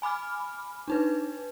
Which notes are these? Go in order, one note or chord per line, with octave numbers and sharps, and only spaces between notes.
G#5 B5 D6 F6
D4 D#4 B4